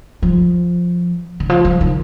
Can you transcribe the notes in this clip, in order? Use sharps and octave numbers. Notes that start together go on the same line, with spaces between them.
F3
D#3
F3
F3
D#3